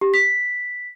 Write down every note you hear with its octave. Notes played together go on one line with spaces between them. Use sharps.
G4
B6